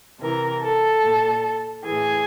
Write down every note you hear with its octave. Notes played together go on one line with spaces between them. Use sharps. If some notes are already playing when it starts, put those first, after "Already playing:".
C3 E3 A#4
A4
A#2
A2 E3 G#4